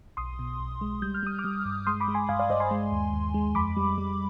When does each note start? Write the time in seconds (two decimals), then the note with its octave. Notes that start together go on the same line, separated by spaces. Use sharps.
0.17 B1 C6 D#6
0.39 B2
0.60 B1
0.81 G#3
1.02 G3 G6
1.14 F6
1.23 G3 D#6
1.39 D6 F6
1.44 G3
1.65 G2
1.87 G#3 C6 D#6
2.00 B5 D6
2.08 G#3
2.14 G#5 C6
2.29 G2 F5 G#5
2.39 D5 F5
2.50 G2 C5 D#5
2.60 G#5 C6
2.71 G#3
2.92 D#2
3.13 D#2
3.34 G#3
3.55 F2 B5 D6
3.77 G3
3.98 G3